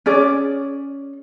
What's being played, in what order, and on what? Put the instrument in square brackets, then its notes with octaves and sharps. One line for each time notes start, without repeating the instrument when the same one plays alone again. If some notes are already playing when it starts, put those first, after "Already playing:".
[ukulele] C#4 G#4 D5